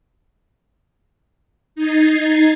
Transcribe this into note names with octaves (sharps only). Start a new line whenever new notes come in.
D#4 G#6 A6 C7